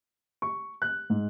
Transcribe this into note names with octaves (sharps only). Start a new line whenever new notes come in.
C#6
F#6
G#2